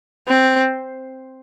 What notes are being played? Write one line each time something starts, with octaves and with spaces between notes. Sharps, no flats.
C4